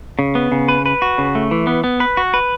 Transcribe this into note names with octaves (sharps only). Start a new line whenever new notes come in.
C#3
B3
C#3
B4
B4
F#4
C#3
A3
E3
B3
B3
B4
F#4
B4